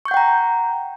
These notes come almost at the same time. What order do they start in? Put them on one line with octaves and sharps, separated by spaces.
C#6 G6 F#5 G5 A#5